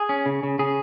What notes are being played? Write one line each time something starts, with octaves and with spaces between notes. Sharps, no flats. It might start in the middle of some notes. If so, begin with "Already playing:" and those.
Already playing: G#4
C#4
C#3
C#3
C#3 G#4